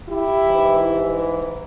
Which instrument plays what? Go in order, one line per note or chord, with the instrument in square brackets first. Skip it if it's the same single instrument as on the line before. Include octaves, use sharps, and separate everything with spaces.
[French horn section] E4 G4
G#2 E3